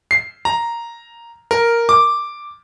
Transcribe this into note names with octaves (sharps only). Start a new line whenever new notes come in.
C7
A#5
A#4
D6